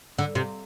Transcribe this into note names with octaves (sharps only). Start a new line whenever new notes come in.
D3
C3